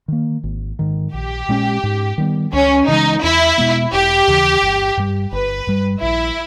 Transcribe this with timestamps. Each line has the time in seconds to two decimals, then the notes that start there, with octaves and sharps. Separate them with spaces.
0.08 D#3 A#3
0.44 G#1
0.79 G#2 D#3
1.14 A#1 G4
1.49 A#2 G#3 C#4
1.83 G#2
2.18 D#3 G3 B3
2.53 C#2 C#4
2.88 C#3 E3 G#3 D#4
3.22 E2 E4
3.58 B2 G#3 B3
3.93 E1 G4
4.27 D#2 C#3 E3
4.62 G1
4.97 G2 G3
5.32 G1 B4
5.67 G2 G3
6.02 A#1 E4